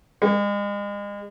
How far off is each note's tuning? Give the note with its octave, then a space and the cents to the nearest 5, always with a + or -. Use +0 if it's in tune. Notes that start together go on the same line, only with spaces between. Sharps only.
G#3 -35